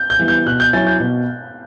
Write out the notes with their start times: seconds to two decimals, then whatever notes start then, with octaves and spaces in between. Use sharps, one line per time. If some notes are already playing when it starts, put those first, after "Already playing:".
Already playing: G6
0.10 G6
0.19 E3 G3 B3 E4
0.28 G6
0.46 B2 F#6
0.60 G6
0.73 F#3 C#4 E4 A6
0.87 G6
1.00 B2